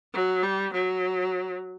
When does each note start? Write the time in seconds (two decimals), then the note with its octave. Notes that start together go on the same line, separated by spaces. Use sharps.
0.14 F#3
0.43 G3
0.73 F#3